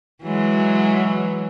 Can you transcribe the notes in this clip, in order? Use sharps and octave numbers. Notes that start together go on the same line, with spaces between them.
E3 F#3 G#3